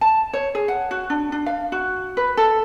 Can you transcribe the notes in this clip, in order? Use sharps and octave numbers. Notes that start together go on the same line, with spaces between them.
A5
C#5
G#4
F#5
F#4
D4
D4
F5
F#4
B4
A4